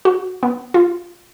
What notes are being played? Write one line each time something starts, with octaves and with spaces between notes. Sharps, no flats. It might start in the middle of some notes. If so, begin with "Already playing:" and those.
F#4
B3
F4